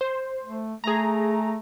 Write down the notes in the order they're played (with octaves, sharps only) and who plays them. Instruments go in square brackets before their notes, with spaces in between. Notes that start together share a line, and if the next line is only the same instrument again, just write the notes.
[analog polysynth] C5
[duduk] A3
[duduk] A3 [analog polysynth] G#4 A#5